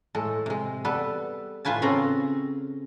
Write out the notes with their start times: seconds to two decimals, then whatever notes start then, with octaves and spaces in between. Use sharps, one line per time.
0.15 A2 G#3 A4
0.46 C3 G#3
0.85 G3 B3 A4 B4
1.65 A2 F4 B4 G#5 A5
1.82 C#3 C4 C#4 A4 C5 A#5